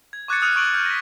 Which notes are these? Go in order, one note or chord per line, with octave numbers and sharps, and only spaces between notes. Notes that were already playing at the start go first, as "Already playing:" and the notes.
G#6
C#6 D6 F#6 G#6 A6 C#7
D#6 F6 F#6 C#7 D#7 F7
C#6 D7 F#7
F6 G6 F#7
A#6 B6